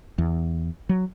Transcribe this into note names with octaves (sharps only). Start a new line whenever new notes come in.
E2
F#3